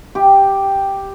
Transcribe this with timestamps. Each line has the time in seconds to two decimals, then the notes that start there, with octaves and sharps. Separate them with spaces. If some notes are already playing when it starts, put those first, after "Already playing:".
0.15 G4